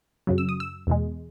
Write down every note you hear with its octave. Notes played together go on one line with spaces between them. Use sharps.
F#2 C#3 F#3
E6
D#6
E6
E2 B2 G#3